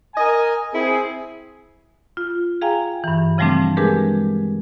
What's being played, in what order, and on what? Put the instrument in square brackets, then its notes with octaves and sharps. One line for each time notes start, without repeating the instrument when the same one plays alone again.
[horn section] A#4 D#5 G#5
C4 E4 G#4
[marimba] F4
G#4 F5 G5 G#5 A#5
G2 E3
C#3 F3 G3 A3 C4 D4
G#3 D4 G4 G#4 A#4 B4